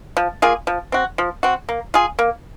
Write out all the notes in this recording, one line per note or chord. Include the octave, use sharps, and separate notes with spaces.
F3
A#3 F4 G#4
F3
C4 F#4
F3
C4 F#4
A#3
F4 G#4
A#3